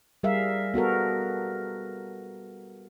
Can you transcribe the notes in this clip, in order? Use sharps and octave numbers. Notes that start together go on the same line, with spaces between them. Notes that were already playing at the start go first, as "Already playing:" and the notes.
G3 G#4 A#4 E5 F5
B3 F#4 A4 A#4